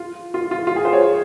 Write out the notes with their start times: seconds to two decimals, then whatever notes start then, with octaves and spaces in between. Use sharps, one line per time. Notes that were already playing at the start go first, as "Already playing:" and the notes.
Already playing: F4
0.34 F4
0.51 F4
0.67 F4
0.76 G#4
0.85 C5
0.93 C#5